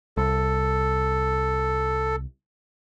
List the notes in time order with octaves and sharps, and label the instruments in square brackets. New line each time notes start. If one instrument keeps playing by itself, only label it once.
[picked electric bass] C2 [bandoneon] A4